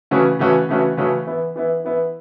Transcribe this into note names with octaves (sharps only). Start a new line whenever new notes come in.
C#3 E3 A3 C#4 F#4
C#3 E3 A3 C#4 F#4
C#3 E3 A3 C#4 F#4
C#3 E3 A3 C#4 F#4
E3 B3 E4
E3 B3 E4
E3 B3 E4